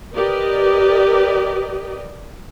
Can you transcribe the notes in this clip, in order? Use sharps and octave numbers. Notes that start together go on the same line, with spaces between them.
G4 A#4 B4 D5 D#5